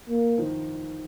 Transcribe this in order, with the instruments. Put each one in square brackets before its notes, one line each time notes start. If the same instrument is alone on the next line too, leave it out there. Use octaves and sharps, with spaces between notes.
[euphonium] A#3
[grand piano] D#3 F3